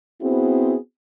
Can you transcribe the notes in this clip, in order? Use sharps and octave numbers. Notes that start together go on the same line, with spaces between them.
B3 C4 E4 F#4 G#4 C5